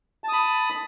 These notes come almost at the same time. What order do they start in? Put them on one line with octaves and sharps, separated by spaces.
A5 D#6 B5